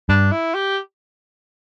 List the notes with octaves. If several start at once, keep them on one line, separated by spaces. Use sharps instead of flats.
G2 D4
E4
G4